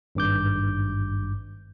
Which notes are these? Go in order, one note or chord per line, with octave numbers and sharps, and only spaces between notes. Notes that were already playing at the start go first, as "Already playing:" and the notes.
G#1 G2 D6 G6